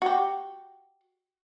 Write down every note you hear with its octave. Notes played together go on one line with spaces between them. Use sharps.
F#4 G4